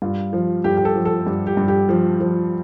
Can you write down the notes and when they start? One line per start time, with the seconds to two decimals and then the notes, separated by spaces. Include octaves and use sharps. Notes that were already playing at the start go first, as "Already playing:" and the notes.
0.02 G2 F4
0.33 F3
0.64 G2 G4
0.77 G4
0.85 A4
0.96 F3
1.05 A4
1.27 G2 G4
1.47 G4
1.57 G2
1.68 G4
1.89 F3
2.20 F3